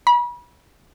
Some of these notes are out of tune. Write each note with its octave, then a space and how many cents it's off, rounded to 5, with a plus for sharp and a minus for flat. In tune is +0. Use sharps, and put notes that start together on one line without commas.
B5 -35